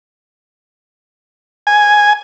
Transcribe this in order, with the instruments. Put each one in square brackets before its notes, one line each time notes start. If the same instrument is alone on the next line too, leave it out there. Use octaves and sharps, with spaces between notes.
[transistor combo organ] G#5